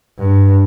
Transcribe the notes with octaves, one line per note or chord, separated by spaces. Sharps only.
G2